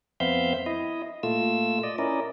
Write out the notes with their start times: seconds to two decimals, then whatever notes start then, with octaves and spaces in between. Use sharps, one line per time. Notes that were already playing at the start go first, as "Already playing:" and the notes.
0.20 F2 B3 C4 E5 F5 G6
0.66 E4 D#5
1.23 A#2 A3 F4 E6
1.83 D5 D#5
1.98 C#4 E4 A#4 D5 D#5